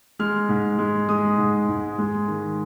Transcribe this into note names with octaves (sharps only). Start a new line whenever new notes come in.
G#3 F6
G#2
G#3
G#3 D#6
G#2
G#2
G#3
D#3